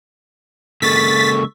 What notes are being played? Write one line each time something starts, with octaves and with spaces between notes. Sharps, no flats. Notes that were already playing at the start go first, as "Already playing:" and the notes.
C#3 G#3 A#3 A4 C#6 A6 B6